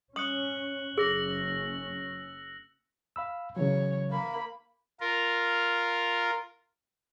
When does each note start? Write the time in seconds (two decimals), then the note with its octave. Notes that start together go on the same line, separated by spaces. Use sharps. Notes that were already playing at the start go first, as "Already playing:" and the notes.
0.16 C#4 D#6 F#6 C#7 F#7
0.97 F#1 C#4 G#4 E6 A#6 F#7
3.16 F5 B5 E6
3.56 C#3 E3 F#3 C#5
4.10 A#3 B5
5.00 F4 A#4